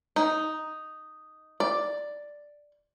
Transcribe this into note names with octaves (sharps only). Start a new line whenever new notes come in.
D#4
D5